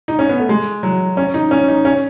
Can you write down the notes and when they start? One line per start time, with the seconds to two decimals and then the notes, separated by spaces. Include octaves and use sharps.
0.08 D#4
0.19 C#4
0.29 B3
0.39 A3
0.49 G#3
0.83 F#3
1.17 C#4
1.34 D#4
1.51 C#4
1.68 D#4
1.85 C#4